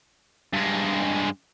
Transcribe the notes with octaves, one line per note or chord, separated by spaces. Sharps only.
G2 G#3